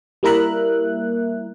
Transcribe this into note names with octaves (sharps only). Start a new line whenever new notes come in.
G3 A#3 E4 A#4 E5 F#6